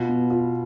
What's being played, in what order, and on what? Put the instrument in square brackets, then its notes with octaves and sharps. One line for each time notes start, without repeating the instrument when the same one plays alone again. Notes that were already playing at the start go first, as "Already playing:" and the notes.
Already playing: [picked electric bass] B2 [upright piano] F4
[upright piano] B3
F4